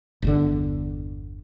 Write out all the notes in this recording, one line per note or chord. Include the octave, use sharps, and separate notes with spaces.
G1 E2 D3